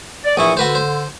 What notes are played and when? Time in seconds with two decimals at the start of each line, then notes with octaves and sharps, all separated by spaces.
0.24 D5
0.37 A#1 E3 E4 C#6 D#6
0.57 D3 F#4 B4 C5
0.75 C5